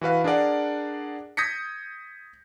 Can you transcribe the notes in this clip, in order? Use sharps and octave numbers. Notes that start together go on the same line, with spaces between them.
E3 F#4 B4 F5
D4 G#4 A#4 D5 F#5
D#6 G6 G#6 A#6 B6 C#7